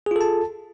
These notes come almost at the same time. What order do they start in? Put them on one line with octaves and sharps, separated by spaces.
G#4 F4 A4 A5